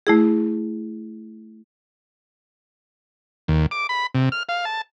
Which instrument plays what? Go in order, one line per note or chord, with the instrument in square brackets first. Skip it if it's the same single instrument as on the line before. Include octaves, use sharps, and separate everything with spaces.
[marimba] A3 E4 G#4
[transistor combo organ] D#2
D6
B5
C3
F6
F5
A5